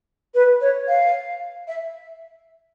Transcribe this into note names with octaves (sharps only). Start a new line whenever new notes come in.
B4
C#5
F5
E5